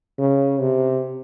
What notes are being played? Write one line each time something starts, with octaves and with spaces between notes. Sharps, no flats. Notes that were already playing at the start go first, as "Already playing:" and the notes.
C#3
C3